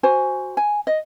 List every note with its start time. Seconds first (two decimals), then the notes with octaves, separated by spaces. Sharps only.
0.03 F#4 C5 G#5
0.57 G#5
0.87 D#5